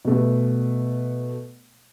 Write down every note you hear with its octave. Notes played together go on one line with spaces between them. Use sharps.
B2 A3